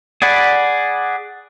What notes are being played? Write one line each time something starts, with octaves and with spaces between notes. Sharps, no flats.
G#4 D5 F#5 B5